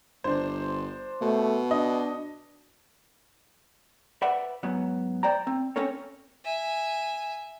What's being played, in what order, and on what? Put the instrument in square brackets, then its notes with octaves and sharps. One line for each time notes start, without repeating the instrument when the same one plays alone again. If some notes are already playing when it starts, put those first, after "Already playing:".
[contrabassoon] G1 [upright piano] D4 C5
[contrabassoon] B2 [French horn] A3
[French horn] D4 [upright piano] D#5
[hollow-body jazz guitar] B4 C5 D5 E5 F#5
G#2 F#3 B3
C5 D5 G5 A#5
C4
C4 C#4 A4 A#4 C#5
[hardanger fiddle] E5 G#5